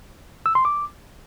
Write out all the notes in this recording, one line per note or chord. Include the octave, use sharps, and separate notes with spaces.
E6
C6
D6